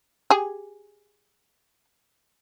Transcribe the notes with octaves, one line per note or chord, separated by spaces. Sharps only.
G4 G#4 G#5